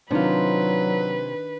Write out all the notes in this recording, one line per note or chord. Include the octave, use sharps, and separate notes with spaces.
C3 D#3 F#3 D4 D#4 F4 B4